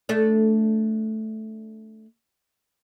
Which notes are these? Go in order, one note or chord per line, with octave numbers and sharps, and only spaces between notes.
A3 D4